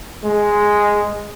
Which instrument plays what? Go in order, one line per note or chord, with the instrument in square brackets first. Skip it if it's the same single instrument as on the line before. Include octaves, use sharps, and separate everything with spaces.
[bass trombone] G#3